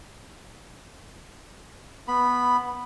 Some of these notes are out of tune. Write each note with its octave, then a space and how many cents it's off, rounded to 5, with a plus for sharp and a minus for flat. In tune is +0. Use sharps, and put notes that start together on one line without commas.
B3 -5 B5 +0